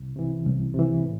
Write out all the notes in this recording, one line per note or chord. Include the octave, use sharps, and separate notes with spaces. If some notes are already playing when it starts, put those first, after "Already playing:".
Already playing: C2
C3 E3
C2
C3 E3
A2